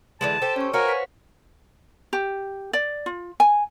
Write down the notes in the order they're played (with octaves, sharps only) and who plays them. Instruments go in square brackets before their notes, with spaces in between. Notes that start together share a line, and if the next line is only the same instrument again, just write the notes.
[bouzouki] D3 E3 G#3 [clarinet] A5
[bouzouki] G4 A4 C5
[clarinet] C#4 [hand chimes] C#5 C#6
[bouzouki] F#4 C#5 [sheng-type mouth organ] A#4 [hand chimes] C5 F5 F#5 [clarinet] G#5
[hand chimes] B4 B6
[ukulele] G4
D5
F4
G#5